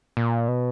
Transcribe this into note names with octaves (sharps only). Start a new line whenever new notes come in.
A#2
B2